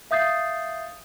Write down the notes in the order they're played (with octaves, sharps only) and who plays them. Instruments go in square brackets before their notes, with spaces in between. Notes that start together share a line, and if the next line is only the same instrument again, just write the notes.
[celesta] E5 F5 D#6 G6 A6 C7